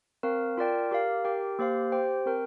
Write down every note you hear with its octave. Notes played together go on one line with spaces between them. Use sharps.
C4 A#4 F5
F4 A#4 D5 G5
G4 A#4 F5
G4 A#4 G5
A#3 G4 C5 F5
G4 C5 G5
C4 A#4 G5